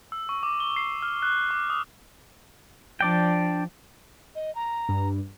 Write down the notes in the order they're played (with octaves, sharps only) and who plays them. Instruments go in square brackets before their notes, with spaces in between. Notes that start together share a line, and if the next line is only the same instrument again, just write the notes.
[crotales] E6
C#6
D6
G7
C7
F6
F#6
D6
D#6
[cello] F3 [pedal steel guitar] D4 D5 G5
[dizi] D#5
A#5
[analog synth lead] G2